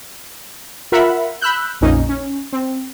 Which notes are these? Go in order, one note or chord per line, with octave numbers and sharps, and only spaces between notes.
F4 A#4 E5 F#5 B5
B5 E6 F#6 G6
A#1 F2 A#2 A#3 C#4 D#4
C#4
C4